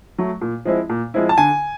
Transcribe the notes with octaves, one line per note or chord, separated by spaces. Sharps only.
F#3 A3
A#2
F3 G#3 C4 E4
A#2
F3 G#3 C4 E4
A5
D3 G#5